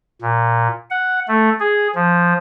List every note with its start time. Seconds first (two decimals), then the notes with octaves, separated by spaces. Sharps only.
0.21 A#2
0.90 F#5
1.28 A3
1.60 G#4
1.95 F3